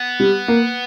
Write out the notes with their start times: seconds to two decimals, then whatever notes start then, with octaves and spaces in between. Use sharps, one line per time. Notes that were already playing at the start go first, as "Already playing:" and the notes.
Already playing: B3
0.20 G3
0.48 A#3